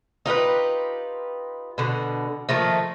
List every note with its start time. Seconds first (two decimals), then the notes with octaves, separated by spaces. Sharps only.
0.26 D#4 F4 G4 B4
1.78 B2 D3
2.49 D#3 F3 A3 A#3